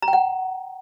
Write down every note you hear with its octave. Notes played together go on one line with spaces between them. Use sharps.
A#5
G5
F#5